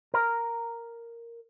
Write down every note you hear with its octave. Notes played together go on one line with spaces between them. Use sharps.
A#4 A#5